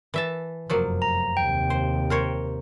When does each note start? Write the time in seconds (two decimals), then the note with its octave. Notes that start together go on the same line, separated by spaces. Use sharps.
0.14 E3 E5 A5
0.70 F1 F#2 F3 F#3 A#3
1.02 A#5
1.37 D#2 C3 G5
1.70 C5
2.10 A#4 C5 C#5